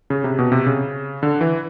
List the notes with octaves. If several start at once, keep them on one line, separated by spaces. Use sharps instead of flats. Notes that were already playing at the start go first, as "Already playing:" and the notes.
C#3
C3
B2
C3
C#3
D3
E3